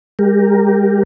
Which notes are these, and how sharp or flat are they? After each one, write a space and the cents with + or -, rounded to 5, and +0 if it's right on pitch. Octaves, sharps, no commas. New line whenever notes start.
G#3 -45 G4 +0 A#4 +0